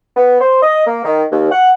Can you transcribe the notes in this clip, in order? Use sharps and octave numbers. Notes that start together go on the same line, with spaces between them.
B3
C5
D#5
A#3
D#3
D#2
F#5